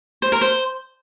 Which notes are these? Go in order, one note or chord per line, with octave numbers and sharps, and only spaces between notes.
C5
A#4
C5